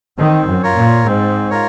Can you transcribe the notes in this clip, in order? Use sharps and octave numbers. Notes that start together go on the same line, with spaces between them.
D#3 C4
F#2
F4 A#4 C#5
A#2
G#2 C4
F4 A#4 C#5